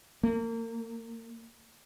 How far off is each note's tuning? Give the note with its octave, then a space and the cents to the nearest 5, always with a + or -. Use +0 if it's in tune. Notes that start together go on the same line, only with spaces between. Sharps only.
A#3 -30